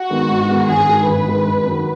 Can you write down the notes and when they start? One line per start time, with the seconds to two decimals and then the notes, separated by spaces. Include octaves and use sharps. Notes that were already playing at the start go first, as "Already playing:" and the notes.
Already playing: F#4
0.10 D#3 G#3 B3 D#4
0.29 G#2
0.49 D#3 G#3 B3 D#4
0.69 G#1 G#4
0.89 G#2 D#3 G#3
1.07 G#1 B4
1.27 G#2 D#3 G#3
1.47 G#1
1.66 F#2 D#3 F#3